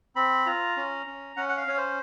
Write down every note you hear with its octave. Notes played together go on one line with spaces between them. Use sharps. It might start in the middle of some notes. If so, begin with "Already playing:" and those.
C4 B5
F4 A#5
C#4
C#4
C#4 F#5
F#5
F5
C#4 C#5
C5